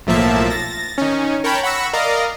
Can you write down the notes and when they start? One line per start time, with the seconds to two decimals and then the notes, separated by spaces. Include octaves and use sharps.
0.07 B1 A2 F3 A#3 E5 A5
0.50 A6 A#6
0.98 D#3 C#4
1.44 A#4 C#5 G5 A5 B5
1.63 F#5 B5 C#6 E6 A#6
1.93 A#4 D5 D#5 F5 A#5